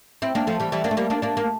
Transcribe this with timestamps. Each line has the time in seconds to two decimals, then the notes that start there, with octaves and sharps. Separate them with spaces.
0.22 C4 E4
0.35 A#3 D4
0.47 F3 A3
0.60 E3 G3
0.72 E3 G3
0.84 A#3 D4
0.91 A3
0.97 G3 A#3
1.10 A#3 D4
1.22 A#3 D4
1.37 A#3